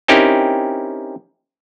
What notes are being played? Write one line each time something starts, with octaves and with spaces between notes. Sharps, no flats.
C4 C#4 D#4 E4 G4 A#4